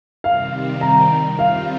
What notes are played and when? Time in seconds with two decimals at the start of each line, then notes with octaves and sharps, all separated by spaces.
0.24 C3 D#3 G3 C4 F5
0.81 A#5
1.38 G3 C4 F4 F5